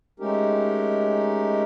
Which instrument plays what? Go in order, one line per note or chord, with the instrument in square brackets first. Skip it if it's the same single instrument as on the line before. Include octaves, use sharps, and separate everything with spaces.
[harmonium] G#3 A3 C#4 D#4 G4 A#4